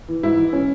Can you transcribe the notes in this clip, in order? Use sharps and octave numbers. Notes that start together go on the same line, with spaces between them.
E3
G#2 E4
E3
C#4